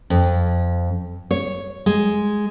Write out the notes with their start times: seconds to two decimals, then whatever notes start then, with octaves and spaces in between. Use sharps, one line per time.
0.10 F2
1.31 C#5
1.86 G#3